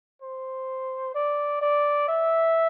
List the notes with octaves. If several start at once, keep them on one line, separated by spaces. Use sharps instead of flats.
C5
D5
D5
E5